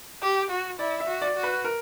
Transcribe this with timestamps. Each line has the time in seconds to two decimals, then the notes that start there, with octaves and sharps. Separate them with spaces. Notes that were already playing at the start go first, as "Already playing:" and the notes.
0.22 G4
0.50 F#4
0.79 E4 D5
1.00 E5
1.07 F#4
1.22 D5
1.36 F#4
1.43 B4
1.64 A#4